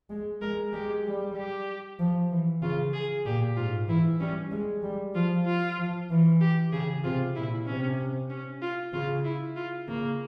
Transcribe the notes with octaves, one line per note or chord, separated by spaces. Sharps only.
G#3
G#3 A#4
G#3 G4
G3
G4
F3
E3
C#3 F4
G#4
A#2 G4
G#2 F4
E3 E4
G3 C#4
G#3
G3
F3 F4
F4
F3
E3
G4
C#3 G#4
C3 F4
A#2 E4
C3 C#4
C#4
F4
C#3 F4
E4
F4
C#3 A#3